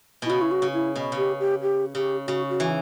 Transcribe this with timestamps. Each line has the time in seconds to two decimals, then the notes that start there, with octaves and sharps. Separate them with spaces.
0.22 B2 E4
0.29 C#3 F#4
0.42 E4
0.51 F#4
0.62 C#3
0.74 E4
0.96 B2
1.12 C#3 G4
1.40 G4
1.62 G4
1.94 C#3 G4
2.27 C#3 F#4
2.49 F#4
2.60 E3